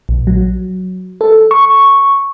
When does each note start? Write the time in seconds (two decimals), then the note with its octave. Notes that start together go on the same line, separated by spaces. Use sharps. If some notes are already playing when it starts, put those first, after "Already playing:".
0.09 A#1
0.27 F#3
1.21 A4
1.51 C#6